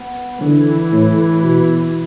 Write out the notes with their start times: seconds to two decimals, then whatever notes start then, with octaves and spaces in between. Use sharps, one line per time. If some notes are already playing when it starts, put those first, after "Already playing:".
Already playing: B3
0.41 D3 E3
0.92 A2
1.44 B2